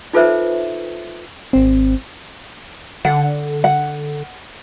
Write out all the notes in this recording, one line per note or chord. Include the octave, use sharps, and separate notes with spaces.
D#4 F4 A4 B4 C5 E5
G#1 C4
D3 F#5
F#5